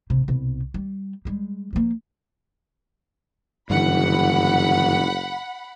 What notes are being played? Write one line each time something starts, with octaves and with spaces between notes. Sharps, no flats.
A1 C3
C2 B2
G3
G3 G#3
F3 A#3
F#1 G2 D3 E3 F#5 B5